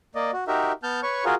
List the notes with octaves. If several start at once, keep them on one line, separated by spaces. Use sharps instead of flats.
A#3 D5 D#5
F#4
D#4 F#4 G4 A#4 E5
B3 A5 F6 G6
B4 C#5 C#6
F4 F#4 G#4 A#4